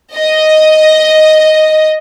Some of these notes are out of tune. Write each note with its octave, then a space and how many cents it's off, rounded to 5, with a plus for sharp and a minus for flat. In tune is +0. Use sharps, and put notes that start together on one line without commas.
D#5 +0